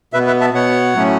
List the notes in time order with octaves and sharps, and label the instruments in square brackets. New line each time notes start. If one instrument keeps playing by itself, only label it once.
[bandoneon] B2 B4 E5
B3
B4 E5
E5 A5
B2 B3 C#5 F#5
A2 F#3 A3 C#4